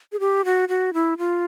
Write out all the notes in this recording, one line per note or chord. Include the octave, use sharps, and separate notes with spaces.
G#4
G4
F#4
F#4
E4
F4